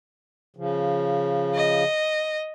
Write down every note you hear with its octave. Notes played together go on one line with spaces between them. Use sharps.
C#3 F3
D#5